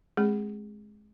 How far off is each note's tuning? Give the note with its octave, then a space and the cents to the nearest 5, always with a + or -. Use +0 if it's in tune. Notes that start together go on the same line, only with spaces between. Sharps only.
G#3 +25 C4 +45 G#4 -20